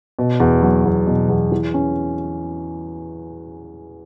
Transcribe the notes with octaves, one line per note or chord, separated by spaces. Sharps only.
B2
E2
F#3
E2
B2
E2
E3
C#4